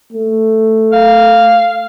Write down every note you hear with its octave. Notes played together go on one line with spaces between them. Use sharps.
A3
F5